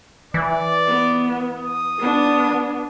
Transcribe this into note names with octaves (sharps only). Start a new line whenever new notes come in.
E3 D5
B3
D#6
B3 D4